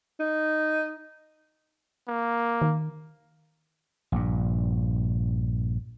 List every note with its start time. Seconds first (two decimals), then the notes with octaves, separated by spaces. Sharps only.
0.20 D#4
2.08 A#3
2.62 D#3
4.12 A#1 G2